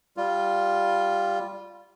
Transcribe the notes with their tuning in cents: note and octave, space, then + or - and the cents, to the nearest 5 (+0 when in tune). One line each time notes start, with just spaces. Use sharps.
G3 +0 F4 +0